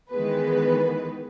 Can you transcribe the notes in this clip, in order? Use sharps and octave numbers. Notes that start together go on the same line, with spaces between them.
D#3 E3 G#3 B3 B4